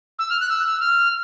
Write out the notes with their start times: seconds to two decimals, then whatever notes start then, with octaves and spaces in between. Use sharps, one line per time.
0.19 E6
0.30 F6
0.41 F#6
0.50 E6
0.66 E6
0.80 F6